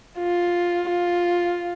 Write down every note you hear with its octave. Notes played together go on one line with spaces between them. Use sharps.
F4
F4